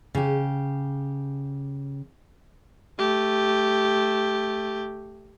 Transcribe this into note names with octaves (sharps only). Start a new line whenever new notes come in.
C#3 G4
A3 G4